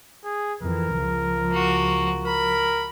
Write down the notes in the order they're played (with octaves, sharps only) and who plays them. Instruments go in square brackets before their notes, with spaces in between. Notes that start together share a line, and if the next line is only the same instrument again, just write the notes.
[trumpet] G#4
[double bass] F2 E3 [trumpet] A#4
[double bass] C#2 F3
[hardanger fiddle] A#3 F#4
[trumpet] A#4 [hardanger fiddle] B5